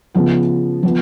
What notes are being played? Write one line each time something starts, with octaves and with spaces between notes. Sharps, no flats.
C#3 F3 B3
F3 B3